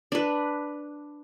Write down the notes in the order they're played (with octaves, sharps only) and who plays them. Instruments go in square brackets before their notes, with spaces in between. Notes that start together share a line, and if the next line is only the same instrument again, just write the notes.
[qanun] D4 B4